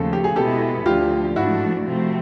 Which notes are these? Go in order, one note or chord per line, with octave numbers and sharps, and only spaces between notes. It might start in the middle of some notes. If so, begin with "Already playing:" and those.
Already playing: D#2 C#3 F3 A3 A4
G4
G#4
B2 G#3 B3 E4 G4 A4
D2 D3 F3 F4 G4
G#2 F3 A3 D4 E4 F#4
C3 F3 A3 C4